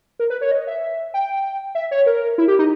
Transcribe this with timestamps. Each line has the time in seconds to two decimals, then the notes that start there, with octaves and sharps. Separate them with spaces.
0.19 A#4
0.30 B4
0.41 C#5
0.51 D#5
0.67 E5
1.14 G5
1.75 E5
1.91 C#5
2.06 A#4
2.38 E4
2.48 G4
2.59 D#4